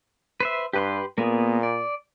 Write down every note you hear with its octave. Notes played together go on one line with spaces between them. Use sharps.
B4 C5 E5
G2 G4 B4 C6
A#2 A#3 B3 G#4
D5